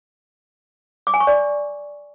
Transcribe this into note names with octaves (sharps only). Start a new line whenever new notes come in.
D6
G#5
C#6
D5